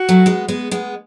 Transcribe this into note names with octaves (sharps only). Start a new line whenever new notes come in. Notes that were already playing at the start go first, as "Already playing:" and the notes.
Already playing: F#4
F#3 A3
G#3 B3
G#3 B3
G#3 B3